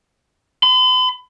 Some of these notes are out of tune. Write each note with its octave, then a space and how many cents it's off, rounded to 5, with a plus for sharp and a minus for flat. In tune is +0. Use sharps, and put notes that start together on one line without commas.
B5 +45